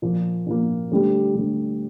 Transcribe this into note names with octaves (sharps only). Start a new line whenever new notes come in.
A#2 F3 A#3
A#2 F3 A#3
D2 D3 G3
D2 D3 G3